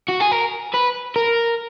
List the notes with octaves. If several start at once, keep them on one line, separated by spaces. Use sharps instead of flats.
F#4
G#4
A#4
B4
A#4